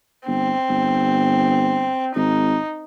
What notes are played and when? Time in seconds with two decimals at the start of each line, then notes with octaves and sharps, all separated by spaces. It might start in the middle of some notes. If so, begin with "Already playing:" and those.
0.27 G1 C4
0.69 G1
2.16 G#1 D#4